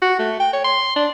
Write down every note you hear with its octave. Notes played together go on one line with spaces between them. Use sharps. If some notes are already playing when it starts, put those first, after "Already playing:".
F#4
A3
G5
C#5
C6
D4